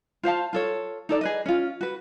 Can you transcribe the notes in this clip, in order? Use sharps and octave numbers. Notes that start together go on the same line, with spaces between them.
F4 C5 F5 A5
F4 A4 C#5
D#4 A4 D5
G#4 B4 D#5
C#4 F4
F#4 B4